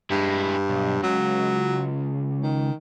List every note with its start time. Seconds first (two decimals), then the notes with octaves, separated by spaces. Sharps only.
0.11 G2 G#3 E4
0.69 B1
1.03 C#2 F#3
2.43 D#3